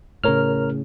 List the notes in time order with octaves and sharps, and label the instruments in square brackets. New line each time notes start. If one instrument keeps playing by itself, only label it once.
[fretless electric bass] A2 C#3 [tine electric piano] A#4 C#5 F6